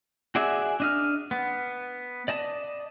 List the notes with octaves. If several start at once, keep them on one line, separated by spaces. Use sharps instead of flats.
F#4 G#4 D5 E5 G#5
D4 D#5 F6
B3
D5 D#5 A5